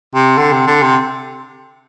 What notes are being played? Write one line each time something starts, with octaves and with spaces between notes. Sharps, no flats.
C3
D3
C3
D3
C3